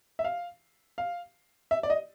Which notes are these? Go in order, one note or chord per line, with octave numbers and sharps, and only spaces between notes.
E5
F5
F5
E5
D5
D#5